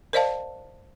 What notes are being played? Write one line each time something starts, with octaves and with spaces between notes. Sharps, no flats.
A#4 C5 D5 D#5 F5 A5